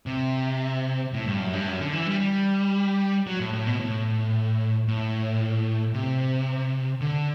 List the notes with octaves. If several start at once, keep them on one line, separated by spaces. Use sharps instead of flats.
C3
A2
G2
F#2
G2
F#2
D3
E3
G3
G3
F#3
A2
A2
B2
A2
A2
C3
D3